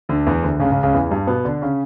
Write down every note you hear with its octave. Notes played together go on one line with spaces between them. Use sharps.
D2 D3
E2 E3
D2 D3
C#2 C#3
C#2 C#3
C#2 C#3
E2 E3
G2 G3
B2 B3
D3 D4
C#3 C#4